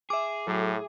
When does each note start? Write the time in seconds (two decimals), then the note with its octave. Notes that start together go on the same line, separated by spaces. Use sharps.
0.10 G#4 E5 D6
0.47 A2 F#3 A4